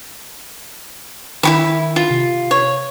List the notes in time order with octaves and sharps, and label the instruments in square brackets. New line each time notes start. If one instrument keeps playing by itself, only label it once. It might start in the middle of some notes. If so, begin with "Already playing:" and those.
[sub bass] D#3 [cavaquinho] E4 F#4 B5
[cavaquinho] F4
[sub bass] C3
[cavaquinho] C#5